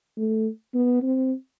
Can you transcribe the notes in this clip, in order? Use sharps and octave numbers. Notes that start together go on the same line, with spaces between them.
A3
B3
C4